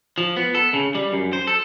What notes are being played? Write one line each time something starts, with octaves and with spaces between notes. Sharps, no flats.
F3
B3
A4
C#3
G3
F#2
C5
A4